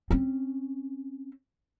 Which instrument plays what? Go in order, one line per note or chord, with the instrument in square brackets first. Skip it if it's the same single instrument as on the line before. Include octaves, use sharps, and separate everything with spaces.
[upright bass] C4 C#4